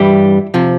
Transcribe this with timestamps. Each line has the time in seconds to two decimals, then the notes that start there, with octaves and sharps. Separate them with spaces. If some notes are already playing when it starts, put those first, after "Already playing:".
Already playing: G2 E3 G3 E4 G4
0.54 C3 F3